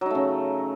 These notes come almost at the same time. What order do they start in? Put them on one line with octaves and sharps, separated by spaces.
F#3 D#4 A3 C#3